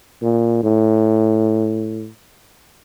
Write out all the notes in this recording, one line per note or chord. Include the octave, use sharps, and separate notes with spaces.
A#2
A2